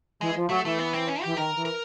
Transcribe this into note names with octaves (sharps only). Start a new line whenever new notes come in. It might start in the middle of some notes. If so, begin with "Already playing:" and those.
E3 G#3
F3
F#3 A3
E3 A3
B3
C4
C#4
E3 G4
D#3 A#4
E3
A#4